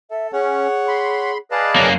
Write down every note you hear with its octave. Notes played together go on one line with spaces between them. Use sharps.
A4 E5
C#4 G#4 C#5 F#5
B5 C6
G#4 B4 D5 D#5 F5 A5
F#2 A#3 C#5